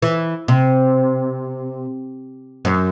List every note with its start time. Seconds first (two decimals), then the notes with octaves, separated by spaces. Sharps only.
0.02 E3
0.48 C3
2.65 F#2